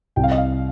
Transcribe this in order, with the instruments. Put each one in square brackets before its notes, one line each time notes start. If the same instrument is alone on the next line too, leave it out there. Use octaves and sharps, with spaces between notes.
[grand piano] C2 [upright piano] G5
[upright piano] F5
D#5
F5